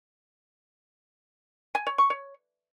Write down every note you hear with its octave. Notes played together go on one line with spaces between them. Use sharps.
G#5
C#5
C#6
C#5